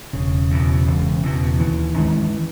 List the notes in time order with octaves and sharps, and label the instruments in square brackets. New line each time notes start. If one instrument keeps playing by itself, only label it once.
[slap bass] E1 [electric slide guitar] C#3
[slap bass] E2 B2
E1
E2 B2
[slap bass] D#2 [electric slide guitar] E3
[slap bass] D#3 G#3 C#4